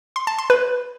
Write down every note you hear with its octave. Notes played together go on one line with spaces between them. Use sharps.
C6
A5
C6
B4